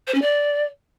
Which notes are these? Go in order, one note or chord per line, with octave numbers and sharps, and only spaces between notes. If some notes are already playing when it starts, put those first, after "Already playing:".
C5
C#4
D5